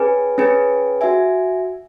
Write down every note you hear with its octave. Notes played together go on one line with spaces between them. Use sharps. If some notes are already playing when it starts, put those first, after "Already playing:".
Already playing: C#4 G#4 B4 G#5
C#4 G#4 B4 G#5
F#4 E5 G#5